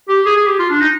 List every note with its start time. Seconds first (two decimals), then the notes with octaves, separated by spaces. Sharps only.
0.09 G4
0.26 G#4
0.36 G#4
0.47 G4
0.59 F4
0.70 D4
0.81 D#4